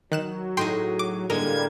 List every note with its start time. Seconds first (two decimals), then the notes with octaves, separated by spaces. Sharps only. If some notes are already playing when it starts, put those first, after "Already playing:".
0.12 D#3 F#3 F#6 E7
0.57 A2 D#4 G#4 G5 C6
0.99 D6
1.30 A2 D3 G3 G#3 A#3 A#4 G#6